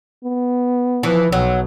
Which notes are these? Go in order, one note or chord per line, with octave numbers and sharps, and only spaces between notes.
B3
E3 F3
B1 F#3